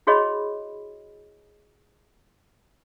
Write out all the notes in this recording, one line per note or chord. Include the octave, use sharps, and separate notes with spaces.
E4 F#4 G#4 C#5 D#5 B5